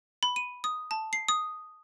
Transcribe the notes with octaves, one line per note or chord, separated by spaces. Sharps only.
B5
D#7
D#6
A5
C7
D#6